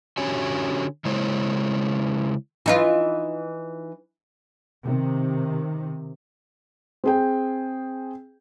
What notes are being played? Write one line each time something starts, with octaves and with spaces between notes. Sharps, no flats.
D3 C#4 F#4 G4 C#5 G#5
C#3 G#3 E4 C5 C#5
E3 D#4 F4
C3 D#3
C4 G#4 G5